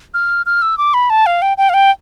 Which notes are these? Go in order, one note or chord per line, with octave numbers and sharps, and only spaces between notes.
F6
F6
E6
D6
B5
A5
F5
G5
G5
F5
G5